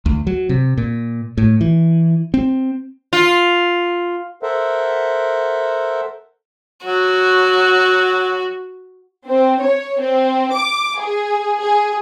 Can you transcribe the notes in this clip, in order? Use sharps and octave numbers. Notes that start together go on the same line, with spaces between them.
D2
F#3
C3
A#2
A2
E3
C4
F4
A4 A#4 C5 E5 F#5
F#3 F#4
C4
C#5
C4
D6
G#4
G#4